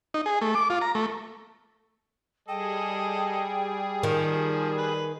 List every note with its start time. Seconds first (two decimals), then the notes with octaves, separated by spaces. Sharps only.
0.14 D#4
0.26 G#4
0.42 A3
0.55 D6
0.70 F4
0.81 A#5
0.95 A3
2.48 G3 G#4 A4 D#5 G5
4.03 D#3 F3
4.78 B4